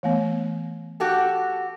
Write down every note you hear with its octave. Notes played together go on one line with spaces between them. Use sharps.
E3 A3 B3
F#4 G4 A4